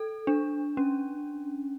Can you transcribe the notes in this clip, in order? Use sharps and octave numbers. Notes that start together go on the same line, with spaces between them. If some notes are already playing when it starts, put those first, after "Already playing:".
Already playing: A4
D4
C#4